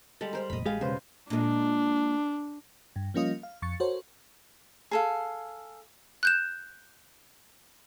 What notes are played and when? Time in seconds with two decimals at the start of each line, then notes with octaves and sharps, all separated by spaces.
0.21 G3 G#3 A4
0.33 A#4 C5 A#5
0.50 F1 A#2 D#5 B5
0.66 A1 G#3 G4 G#4 F5
0.81 E1 C#3 G#3 B4 C5
1.30 A#2 G#3 D4
2.96 G2
3.14 F3 G3 A#3 C#4 F4 D#5
3.43 F5
3.62 F2 C#6 A6 C#7
3.80 F#4 A4 A#4 C5 C#5
4.91 G#4 A4 F5
6.23 F#6 G6 E7